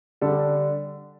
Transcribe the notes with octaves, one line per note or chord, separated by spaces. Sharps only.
D3 G3 D4 A4